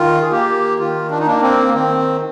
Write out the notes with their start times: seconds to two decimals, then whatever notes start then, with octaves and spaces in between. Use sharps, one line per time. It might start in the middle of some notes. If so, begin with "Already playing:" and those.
Already playing: D#3 F4
0.22 G#4
0.32 A#3 G4
0.79 D#3 F4
1.10 D4
1.19 D#4
1.26 A#3 D4
1.42 C4
1.68 A#3
1.74 D#3 C4